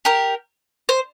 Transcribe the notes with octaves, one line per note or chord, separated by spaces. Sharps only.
G4 A#4
C5